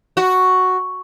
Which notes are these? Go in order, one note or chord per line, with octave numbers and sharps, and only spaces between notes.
F#4